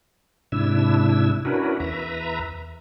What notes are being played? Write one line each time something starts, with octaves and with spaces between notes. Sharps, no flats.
G#2 C3 D4 E4 E6
C#4 D4 E4 F#4 A#4 B4
E2 B4 E5 A#5